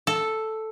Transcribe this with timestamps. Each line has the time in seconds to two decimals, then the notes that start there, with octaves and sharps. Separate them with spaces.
0.07 A4